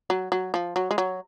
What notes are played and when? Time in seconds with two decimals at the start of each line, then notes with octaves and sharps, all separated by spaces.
0.10 F#3
0.32 F#3
0.54 F3
0.76 F#3
0.91 G#3
0.98 F#3